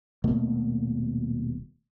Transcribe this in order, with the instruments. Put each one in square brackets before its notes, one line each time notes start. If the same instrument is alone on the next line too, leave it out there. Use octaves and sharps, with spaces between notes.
[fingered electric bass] D#1 B2 A3 A#3